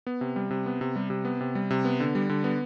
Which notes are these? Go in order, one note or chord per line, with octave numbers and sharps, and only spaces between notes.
B3
C3
G3
C3
B3
C3
G3
C3
B3
C3
G3
C3
B3
D3
G3
D3
B3